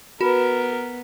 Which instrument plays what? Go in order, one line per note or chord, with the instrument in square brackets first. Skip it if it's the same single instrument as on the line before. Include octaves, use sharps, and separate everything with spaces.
[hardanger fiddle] B3 [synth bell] F#4 [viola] A#4 [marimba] B4 B5